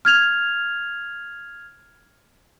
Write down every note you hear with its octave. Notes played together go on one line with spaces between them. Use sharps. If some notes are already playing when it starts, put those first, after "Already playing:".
F6 G#6 F7